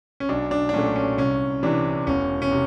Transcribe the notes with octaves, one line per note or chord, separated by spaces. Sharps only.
C#4
B1 D4
D4
D4
A#2 F#3 A3 C#4
C#4
C2 C#4
C3 E3 D4
E1 C#4
C#4
C3